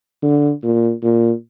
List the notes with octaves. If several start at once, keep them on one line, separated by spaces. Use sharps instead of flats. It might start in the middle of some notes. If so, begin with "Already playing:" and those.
D3
A#2
A#2